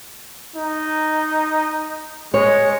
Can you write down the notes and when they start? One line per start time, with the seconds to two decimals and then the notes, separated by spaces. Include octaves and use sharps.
0.56 D#4
2.34 G#3 C#5